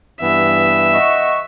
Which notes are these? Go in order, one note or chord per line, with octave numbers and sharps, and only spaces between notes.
G2 E3 B3 E5
D#5 F#5 C#6